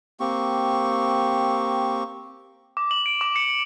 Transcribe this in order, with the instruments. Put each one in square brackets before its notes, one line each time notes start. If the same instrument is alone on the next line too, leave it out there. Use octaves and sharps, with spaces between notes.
[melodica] A#3 C4 G4 C#6
[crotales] D6
F#7
D7
D6
C#7